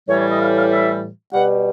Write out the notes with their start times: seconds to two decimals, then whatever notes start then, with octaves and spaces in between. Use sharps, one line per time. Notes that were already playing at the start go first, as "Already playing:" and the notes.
0.07 A2 E3 G3 C#5
0.18 C#5
0.28 D#5
0.38 F5
0.55 F5
0.70 E5
1.33 B2 G3 F#5